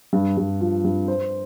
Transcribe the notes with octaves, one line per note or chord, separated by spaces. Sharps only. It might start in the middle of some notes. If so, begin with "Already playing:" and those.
G2
G2
F3
G2
C5